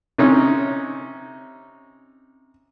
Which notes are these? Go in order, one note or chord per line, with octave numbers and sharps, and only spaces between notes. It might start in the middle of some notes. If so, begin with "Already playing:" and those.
C3 C#4 D#4